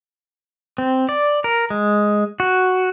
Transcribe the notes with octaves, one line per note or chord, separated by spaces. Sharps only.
C4
D5
A#4
G#3
F#4